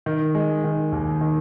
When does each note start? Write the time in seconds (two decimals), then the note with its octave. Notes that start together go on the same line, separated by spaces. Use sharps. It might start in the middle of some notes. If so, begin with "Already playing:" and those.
0.06 D#3
0.35 G#3
0.64 D#3
0.92 D#2
1.21 D#3